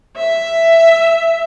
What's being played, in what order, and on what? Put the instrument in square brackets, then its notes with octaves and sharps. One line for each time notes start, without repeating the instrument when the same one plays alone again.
[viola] E5